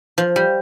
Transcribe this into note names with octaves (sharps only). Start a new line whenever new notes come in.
F3
G3